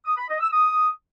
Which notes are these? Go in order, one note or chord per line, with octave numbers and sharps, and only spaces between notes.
D#6
B5
D#5
E6
D#6